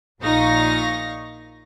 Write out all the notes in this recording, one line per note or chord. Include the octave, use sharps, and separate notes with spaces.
A#1 A#2 D#4 F5 C#6 A#6